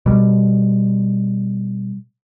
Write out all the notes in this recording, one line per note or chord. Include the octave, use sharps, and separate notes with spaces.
B2 G3